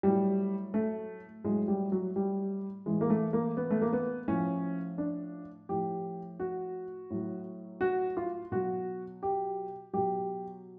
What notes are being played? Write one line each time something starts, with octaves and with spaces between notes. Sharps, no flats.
A2 F#3 G3
A3
A2 F#3 G#3
G3
F#3
G3
A2 E3 G#3
A#3
A3
A#3
B3
A3
A#3
B3
A2 F3 C#4
D4
A2 F3 G4
F#4
A2 F#3
F#4
F4
B2 F#3 F#4
G4
B2 F#3 G4